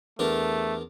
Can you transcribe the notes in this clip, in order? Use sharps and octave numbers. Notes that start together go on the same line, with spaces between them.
E2 A3 D4 A#4